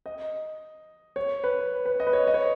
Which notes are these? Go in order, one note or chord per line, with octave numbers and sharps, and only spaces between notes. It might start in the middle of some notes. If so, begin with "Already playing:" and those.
D#5
C#5
B4
B4
D#5
B4
C#5
D#5
C#5